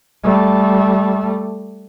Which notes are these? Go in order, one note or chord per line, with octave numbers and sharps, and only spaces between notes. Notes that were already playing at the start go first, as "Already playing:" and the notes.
G3 A3